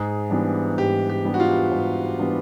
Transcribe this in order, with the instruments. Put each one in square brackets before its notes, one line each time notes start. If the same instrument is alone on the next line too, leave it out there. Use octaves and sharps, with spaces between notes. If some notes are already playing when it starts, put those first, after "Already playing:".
Already playing: [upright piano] G#2 [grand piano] G#4
[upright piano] E3 G3 B3 D4
[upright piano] G#2 [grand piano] G4
[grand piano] G4
[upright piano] E3 G3 B3 D4
[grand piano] F#4
F4
[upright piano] G#2
E3 G3 B3 D4